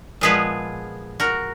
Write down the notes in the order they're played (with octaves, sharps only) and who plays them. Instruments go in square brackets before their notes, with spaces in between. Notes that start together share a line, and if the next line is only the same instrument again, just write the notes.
[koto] A#2 F3 G#3 B3 G#4 B4
F#4 A#4